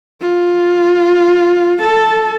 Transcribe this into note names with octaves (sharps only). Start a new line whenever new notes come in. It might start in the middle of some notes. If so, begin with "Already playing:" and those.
F4
A4 A5